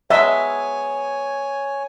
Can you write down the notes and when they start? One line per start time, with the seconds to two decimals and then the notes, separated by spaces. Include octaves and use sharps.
0.10 F#3 G#3 B3 C#5 D#5 E5 G#5 A5